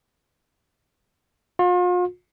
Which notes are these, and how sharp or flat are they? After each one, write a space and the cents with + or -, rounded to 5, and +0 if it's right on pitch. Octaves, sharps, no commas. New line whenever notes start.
F4 +40